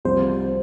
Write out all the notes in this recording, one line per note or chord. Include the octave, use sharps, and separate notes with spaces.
C2 C3 F3 C5